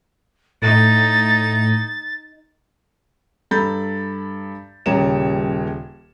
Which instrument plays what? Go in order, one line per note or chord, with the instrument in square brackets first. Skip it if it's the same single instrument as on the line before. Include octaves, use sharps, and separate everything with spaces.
[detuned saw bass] A2 [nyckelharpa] D#4 [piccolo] A6
[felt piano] G2 A4 A#5 B5 G6 A6
D#1 C#3 G3 C#5 A#5 E7